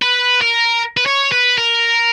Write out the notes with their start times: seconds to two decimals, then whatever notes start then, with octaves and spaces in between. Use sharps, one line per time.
0.02 B4
0.41 A#4
0.97 B4
1.06 C#5
1.32 B4
1.58 A#4